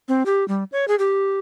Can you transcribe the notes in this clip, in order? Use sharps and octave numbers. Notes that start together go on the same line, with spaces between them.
C4
G4
G3
C#5
G#4
G4